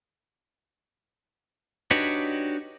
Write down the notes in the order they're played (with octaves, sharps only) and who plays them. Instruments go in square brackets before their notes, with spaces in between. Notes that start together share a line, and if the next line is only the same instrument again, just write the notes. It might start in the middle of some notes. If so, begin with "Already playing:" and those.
[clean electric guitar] D4 D#4 F#4 G4 B4 C#5